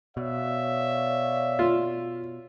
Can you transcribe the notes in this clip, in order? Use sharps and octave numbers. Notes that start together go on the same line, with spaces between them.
B2 C#5 D5 E5 F5
F4